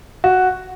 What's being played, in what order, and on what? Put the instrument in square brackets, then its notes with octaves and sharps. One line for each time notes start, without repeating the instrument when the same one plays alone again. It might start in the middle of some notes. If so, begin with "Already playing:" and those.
[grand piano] F#4